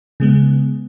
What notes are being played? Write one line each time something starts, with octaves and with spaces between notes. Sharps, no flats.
C#3 G#3 B3